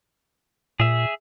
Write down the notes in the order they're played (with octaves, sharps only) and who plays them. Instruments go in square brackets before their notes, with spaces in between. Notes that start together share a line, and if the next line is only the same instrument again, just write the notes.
[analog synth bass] A#2 [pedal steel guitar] G#4 E5